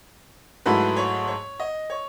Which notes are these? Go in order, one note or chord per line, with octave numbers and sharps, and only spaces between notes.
G#2 F#3 A3 E4 B4
C#5
C#5
D#5
C#5